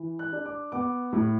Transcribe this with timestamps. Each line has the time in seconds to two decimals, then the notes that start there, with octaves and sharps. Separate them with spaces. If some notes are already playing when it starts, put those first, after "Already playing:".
Already playing: E3
0.19 F#6
0.32 D4
0.46 D6
0.72 B3 D6
1.13 A2